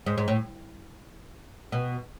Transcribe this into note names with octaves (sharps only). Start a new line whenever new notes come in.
G#2
G#2
A2
B2